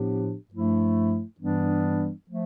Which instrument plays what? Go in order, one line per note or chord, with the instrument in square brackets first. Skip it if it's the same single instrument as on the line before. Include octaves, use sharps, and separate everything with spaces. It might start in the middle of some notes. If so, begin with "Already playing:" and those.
Already playing: [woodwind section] A2 F3 B3 D4 G4
G2 F3 A3 E4
G2 E3 G3 B3 D4
F3 A3